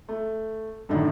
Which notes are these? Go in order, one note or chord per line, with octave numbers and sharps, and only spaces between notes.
A3
F#2 A2 D3 D#3 D4 D#4